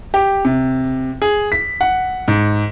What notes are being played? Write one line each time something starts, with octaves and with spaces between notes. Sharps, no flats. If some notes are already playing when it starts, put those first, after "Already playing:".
G4
C3
G#4
B6
F#5
G#2